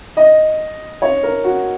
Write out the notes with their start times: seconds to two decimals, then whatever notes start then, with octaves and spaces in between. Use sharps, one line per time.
0.17 D#5
1.02 C#5
1.23 A#4
1.44 F#4